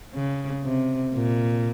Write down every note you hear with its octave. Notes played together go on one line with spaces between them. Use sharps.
C#3
C3
A#2